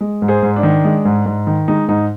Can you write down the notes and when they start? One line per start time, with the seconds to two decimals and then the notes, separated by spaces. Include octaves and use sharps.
0.01 G#3
0.22 G#2
0.28 G#4 C5
0.43 G#2
0.56 D4
0.63 D#3
0.84 G#3
1.05 G#2
1.26 G#2
1.47 D#3
1.68 G#3 D#4
1.88 G#2 D#4